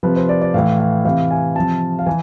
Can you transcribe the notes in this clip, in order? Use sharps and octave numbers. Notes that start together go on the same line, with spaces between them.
C3 F3 B4
C5
D5
D5
A2 E3 F5
F5
C3 E3 F5
G#5
C3 F3 A5
F5
E3 G#5